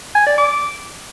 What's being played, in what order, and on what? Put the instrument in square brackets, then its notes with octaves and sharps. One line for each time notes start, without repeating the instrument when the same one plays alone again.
[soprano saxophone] G#5
D5
D6